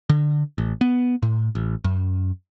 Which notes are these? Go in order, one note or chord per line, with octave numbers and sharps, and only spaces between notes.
D3
A1
B3
A2
A1
F#2